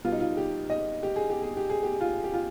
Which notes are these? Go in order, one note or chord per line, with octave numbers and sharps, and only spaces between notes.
B2 G3 F4
D#4
F4
G4
D#5
G4
G#4
G4
G#4
G4
G#4
G4
F4
G4
F4